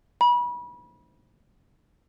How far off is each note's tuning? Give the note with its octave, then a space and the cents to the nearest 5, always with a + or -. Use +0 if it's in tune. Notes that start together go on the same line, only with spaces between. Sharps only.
B5 -30